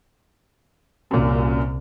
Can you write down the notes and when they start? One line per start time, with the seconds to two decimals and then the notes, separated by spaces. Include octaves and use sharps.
1.11 C2 F#2 A#2